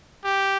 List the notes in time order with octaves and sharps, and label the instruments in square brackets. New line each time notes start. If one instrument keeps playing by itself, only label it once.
[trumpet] G4